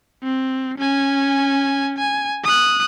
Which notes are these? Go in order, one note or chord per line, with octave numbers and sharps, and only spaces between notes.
C4
C#4 G#5
G#5
D#6 F#6